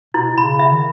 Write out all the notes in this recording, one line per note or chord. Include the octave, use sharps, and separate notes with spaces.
B2 E4
C#3 B5
E5
D#3